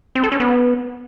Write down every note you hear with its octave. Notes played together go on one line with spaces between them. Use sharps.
C4
A4
C#4
B3